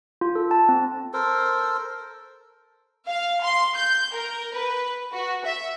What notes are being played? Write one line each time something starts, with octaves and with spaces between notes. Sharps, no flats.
F4
A4
A5
C4
A4 A#4 C5
F5
C6
G6
A#4
B4
F#4
E5